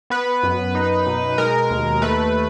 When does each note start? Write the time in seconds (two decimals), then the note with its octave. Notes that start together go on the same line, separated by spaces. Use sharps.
0.10 B3 B4
0.43 F#2
0.75 D#4
1.06 B2
1.38 G#3 A#4
1.70 D#2
2.02 A3 B4